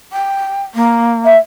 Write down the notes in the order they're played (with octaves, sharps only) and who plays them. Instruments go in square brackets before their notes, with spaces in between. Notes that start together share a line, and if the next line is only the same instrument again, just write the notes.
[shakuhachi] G5
A#3
[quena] E5